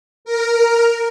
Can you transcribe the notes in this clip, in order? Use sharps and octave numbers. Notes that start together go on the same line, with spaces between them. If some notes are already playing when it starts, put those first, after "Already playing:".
A#4